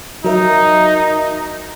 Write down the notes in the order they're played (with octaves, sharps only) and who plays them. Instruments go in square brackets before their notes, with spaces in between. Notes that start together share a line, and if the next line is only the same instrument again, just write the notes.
[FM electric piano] F#3 A#4 E5 [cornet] D#4